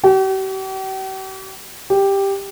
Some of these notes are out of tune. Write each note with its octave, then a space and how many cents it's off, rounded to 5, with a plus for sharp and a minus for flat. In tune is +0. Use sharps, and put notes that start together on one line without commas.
G4 -45
G4 +5